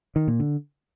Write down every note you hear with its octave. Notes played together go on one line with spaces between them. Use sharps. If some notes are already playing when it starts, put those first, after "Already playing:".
D#3
A#2
D3